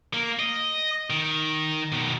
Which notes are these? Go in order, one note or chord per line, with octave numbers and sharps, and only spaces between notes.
A#3
D#5
D#3
B2 D#3